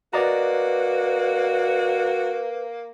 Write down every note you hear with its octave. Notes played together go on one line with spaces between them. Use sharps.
A#3 F#4 B4 D5 D#5 A#5